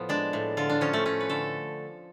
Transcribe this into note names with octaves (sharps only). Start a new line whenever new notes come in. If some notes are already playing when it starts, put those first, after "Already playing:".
Already playing: A2 F3 B3
G#3 D4
A2
D3 F4
D4
F3 C#4
A3
A3 C#4
B4
D3 A4